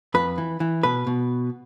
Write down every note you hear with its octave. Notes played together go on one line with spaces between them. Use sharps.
F2 B4
E3
E3
B2 B4
B2